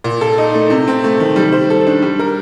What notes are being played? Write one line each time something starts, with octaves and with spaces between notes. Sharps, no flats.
A#2
A4
D#4
A3
C3
C4
A3
D#3
G3
C5
A4
D4
G3
A#4